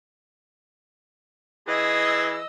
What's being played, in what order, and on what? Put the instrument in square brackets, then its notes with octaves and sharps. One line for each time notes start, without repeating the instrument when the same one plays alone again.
[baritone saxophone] E3 [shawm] G#4 [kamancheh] D#5 E6